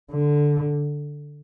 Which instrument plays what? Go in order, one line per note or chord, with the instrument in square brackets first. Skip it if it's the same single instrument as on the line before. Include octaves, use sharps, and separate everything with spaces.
[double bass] D3